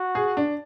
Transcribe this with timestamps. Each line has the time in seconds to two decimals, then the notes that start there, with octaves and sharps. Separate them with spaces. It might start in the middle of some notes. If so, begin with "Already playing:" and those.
Already playing: F#4
0.15 G#4
0.37 D4